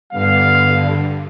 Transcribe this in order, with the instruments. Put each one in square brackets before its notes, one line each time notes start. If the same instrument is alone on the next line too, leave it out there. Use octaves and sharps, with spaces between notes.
[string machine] G2 D3 [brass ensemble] G3 B3 F5